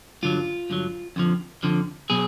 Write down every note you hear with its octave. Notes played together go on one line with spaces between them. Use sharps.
G2 D3 F#3 F4
G2 D3 F#3
F2 D3 F3
F2 D3 F3
B2 F#3 G#4